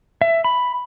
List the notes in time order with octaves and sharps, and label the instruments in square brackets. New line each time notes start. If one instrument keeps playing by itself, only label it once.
[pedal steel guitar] E5
B5